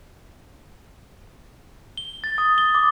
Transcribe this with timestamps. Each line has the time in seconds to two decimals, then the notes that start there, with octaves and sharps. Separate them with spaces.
1.97 G7
2.24 A6
2.38 D#6
2.58 G7
2.75 D6